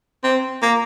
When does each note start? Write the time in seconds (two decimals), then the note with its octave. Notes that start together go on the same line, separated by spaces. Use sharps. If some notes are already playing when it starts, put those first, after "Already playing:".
0.24 C4
0.62 A#3